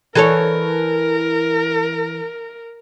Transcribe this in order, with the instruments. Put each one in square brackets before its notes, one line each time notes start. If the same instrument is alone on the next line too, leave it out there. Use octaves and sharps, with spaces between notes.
[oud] E3 A4 C#5 [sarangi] A#4